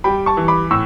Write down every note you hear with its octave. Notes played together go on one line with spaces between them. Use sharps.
G3 G5 B5
A5 C#6
E3
B5 D6
A2 C#6 E6